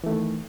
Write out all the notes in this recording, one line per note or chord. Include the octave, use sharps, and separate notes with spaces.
D#3 E3 A3